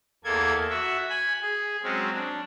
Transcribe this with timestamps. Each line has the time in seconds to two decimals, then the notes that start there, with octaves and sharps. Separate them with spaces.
0.24 E2 A#3 A4 G#6
0.70 F#4 E5
1.09 G#5 B5
1.42 G#4
1.83 F#3 G#3 C4 C#4
2.13 D4